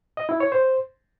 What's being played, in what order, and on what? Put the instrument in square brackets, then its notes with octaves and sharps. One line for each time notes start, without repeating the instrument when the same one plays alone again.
[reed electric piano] D#5
E4
C#5
C5